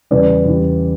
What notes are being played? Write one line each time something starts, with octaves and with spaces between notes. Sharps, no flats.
E2 C#3 E3 G3 B4 D5
E2 C#3 E3 G3